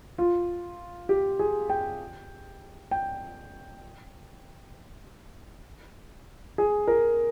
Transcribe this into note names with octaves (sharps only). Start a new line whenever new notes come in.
F4
G4
G#4
G5
G5
G#4
A#4